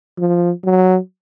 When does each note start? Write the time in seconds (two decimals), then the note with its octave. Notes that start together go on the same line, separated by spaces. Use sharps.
0.18 F3
0.65 F#3